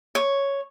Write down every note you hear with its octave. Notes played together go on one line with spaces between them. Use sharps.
C#5